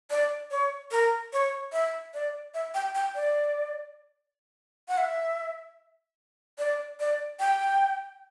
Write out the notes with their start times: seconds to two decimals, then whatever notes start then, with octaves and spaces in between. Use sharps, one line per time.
0.10 D5
0.51 C#5
0.91 A#4
1.33 C#5
1.73 E5
2.14 D5
2.54 E5
2.74 G5
2.95 G5
3.15 D5
4.88 F#5
4.98 E5
6.58 D5
7.00 D5
7.39 G5